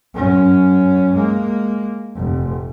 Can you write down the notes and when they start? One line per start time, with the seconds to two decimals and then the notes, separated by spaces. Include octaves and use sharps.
0.14 F#2 C#4
1.14 G#3 A#3
2.16 F1